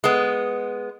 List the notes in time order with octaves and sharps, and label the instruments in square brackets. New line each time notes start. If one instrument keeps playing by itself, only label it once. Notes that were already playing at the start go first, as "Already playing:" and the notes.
[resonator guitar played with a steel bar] G#3 B3